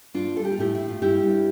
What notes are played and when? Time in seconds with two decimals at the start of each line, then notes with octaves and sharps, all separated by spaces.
0.14 G2 D4 F4
0.36 G3 A4
0.45 G4
0.52 F4
0.58 A2 E4 G4
0.75 A2 E4
0.89 F4
1.02 G2 E4 G4
1.23 G2